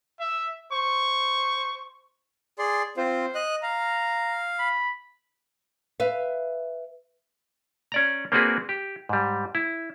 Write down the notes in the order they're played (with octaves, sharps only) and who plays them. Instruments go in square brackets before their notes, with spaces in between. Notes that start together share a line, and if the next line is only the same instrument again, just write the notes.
[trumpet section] E5
C5 C#6
[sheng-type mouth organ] G#4 D5 C6
[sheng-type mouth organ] C4 F4 [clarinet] C5
[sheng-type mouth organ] D#5 F#6
[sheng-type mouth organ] F5 [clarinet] A#5
[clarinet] B5
[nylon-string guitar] B4 E5 F5
[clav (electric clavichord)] C#4 D5 A#5
A#3 C4 D4 F#4 G#4 B4
G4
G#2 G3
E4